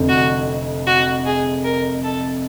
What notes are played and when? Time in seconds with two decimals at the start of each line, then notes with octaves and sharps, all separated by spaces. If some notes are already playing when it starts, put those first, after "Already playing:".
Already playing: F1 F2 D3
0.08 F#4
0.86 F#4
1.25 G#4
1.64 A#4
2.03 A4